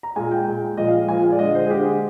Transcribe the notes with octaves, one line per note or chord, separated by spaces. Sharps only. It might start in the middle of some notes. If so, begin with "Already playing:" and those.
A#5
A#2 G#3 G#5
G5
A#2 G#3
A#2 F3 G#3 D#5
F5
A#2 F3 G#3 G#5
F5
D5
D3 G#3 D#5
C5
G#4
D3 G#3 G4